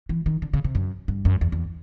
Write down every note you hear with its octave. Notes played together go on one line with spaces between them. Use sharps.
E3
D#3
D3
C#3
C3
F#2
G2
F#2
E2
E2